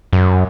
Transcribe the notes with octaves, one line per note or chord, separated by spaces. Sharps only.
F#2